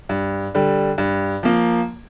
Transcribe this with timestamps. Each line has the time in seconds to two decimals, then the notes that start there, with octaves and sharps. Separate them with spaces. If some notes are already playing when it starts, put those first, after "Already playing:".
0.09 G2
0.55 D3 G3
0.98 G2
1.43 F3 A#3